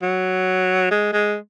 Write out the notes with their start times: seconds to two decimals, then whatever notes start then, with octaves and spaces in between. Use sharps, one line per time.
0.02 F#3
0.91 G#3
1.13 G#3